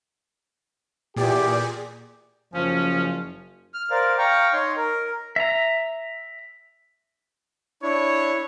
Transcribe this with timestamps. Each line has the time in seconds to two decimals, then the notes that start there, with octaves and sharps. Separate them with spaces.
1.16 E2 A#2 G4 G#4 D5
2.54 F#1 F3 C#4
3.74 F6
3.91 A#4 C5 D5 F5
4.18 F5 G5 A#5 C#6
4.53 D#4 C#5 C6
4.77 A#4
5.36 E5 A#5
7.82 D4 E4 C#5